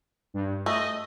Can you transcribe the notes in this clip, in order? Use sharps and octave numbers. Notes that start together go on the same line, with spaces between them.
G2
A3 D#5